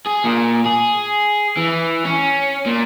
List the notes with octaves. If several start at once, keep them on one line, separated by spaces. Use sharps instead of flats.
G#4
A#2
G#4
E3
C#4
A#2